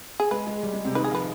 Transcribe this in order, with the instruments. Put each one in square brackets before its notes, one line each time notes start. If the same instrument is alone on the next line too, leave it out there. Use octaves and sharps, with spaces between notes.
[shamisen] G#4
[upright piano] G#3 [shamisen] B4
[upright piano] G#3
G3
G#3
C3 C4
[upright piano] D#3 D#4 [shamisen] B4
[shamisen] G#4
[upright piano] F3 F4 [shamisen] B4